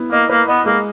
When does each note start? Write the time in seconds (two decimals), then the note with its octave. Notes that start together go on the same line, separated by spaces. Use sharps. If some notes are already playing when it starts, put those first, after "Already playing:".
Already playing: B3 E4
0.12 A#3 D#5
0.29 A#3 B4
0.48 B3 D#5
0.65 G#3 A#3